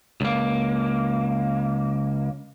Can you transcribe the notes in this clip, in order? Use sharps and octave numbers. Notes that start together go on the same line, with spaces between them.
C#2 A#3